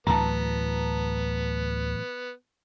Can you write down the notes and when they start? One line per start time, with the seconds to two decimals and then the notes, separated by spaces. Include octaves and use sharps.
0.07 D2 A2 E3 F#3 B3 A5 A#5